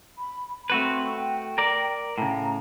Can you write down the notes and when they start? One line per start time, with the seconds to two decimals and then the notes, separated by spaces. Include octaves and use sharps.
0.18 B5
0.70 A3 C4 F#4 B4
1.14 G5
1.58 A#4 D5
2.18 A2 C#3 A#5